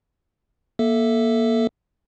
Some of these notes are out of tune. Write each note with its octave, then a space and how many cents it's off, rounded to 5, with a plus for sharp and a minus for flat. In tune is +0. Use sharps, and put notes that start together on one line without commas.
A#3 +20 A4 +0 E5 +0